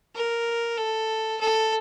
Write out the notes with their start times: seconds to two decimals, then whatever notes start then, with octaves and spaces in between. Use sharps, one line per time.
0.15 A#4
0.77 A4
1.40 A4